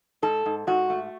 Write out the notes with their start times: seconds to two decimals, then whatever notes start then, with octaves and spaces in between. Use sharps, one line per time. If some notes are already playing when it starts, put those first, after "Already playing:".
0.22 G#2 A4
0.46 G#2
0.67 G#2 F#4
0.90 A3